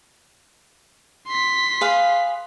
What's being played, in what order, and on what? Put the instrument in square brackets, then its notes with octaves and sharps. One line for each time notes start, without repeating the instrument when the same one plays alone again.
[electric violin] C6 B6
[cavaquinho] G#4 B4 F5